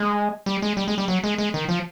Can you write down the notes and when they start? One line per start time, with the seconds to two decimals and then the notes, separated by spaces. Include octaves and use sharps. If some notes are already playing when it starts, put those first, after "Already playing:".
Already playing: G#3
0.46 G3
0.62 G#3
0.77 G3
0.88 G#3
0.98 G3
1.08 F#3
1.24 G#3
1.38 G#3
1.54 D#3
1.69 F3